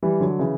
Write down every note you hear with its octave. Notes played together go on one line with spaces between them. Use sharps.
E3 G3
D3 F#3
C#3 E3